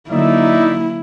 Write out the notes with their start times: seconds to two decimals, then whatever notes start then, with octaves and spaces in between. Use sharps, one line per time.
0.11 D3 F#3 A#3 D#4 E4 D5 E5